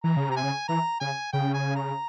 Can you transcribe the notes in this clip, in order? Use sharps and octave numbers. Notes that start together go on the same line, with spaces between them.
E3 A#5
C#3
C3 A#5
G#5
C#3
E3 A#5
C#3 G#5
C#3 G5
G#5
A#5